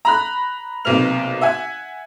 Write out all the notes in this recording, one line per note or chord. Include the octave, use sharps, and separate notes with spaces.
A#5 B5 F#6
B1 C3 A#3 B3 F6 F7
E5 F#5 G#5